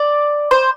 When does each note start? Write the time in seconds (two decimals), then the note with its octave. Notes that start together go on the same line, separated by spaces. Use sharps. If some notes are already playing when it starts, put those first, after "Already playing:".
Already playing: D5
0.51 C5